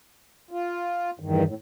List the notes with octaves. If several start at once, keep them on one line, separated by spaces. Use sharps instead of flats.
F4
E2 G2 D#3
A2